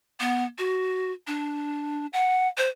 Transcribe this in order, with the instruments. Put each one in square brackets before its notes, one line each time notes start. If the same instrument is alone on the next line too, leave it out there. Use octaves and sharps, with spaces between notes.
[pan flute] B3
F#4
D4
F#5
C5